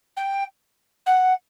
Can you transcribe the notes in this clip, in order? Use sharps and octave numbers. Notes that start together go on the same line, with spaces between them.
G5
F#5